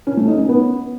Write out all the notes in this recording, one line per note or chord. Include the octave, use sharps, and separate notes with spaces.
C#4
A3
D#4
C#4
B3